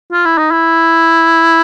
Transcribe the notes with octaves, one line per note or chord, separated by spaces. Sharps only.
F4
E4
D#4
E4